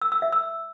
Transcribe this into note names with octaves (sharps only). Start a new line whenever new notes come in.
E6
E6
E5
E6